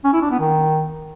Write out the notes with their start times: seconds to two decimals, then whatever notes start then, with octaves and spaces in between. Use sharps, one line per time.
0.04 C#4
0.13 E4
0.22 D4
0.31 B3
0.39 D#3